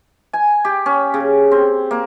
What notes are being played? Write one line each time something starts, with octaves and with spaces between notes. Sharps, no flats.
G#5
G4
C#4
C#3
C4
A#3